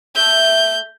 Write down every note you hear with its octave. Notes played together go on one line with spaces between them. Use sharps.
A3 E5 G6